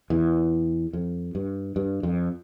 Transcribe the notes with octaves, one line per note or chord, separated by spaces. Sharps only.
E2
F2
G2
G2
F2